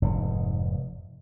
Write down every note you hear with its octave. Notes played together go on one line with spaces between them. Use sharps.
F1 G#2